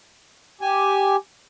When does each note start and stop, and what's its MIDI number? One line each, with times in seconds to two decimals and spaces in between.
0.61 1.16 67
0.61 1.16 80